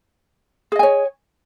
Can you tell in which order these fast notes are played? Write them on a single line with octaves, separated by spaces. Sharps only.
G#4 D#5 G#5 C#5